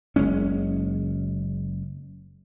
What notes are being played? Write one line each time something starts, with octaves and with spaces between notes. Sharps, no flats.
F#1 G#3 C#4